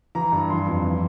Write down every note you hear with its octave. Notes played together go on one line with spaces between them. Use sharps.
E3 A#5
G2
E3 C6
F2
E3